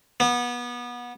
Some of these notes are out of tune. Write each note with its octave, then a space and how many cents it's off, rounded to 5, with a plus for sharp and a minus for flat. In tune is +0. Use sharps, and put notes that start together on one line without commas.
B3 -25